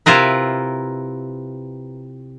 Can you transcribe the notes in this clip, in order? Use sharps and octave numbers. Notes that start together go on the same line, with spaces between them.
C3 E4 F4 A#4 B4